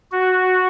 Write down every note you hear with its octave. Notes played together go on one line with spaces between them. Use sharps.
F#4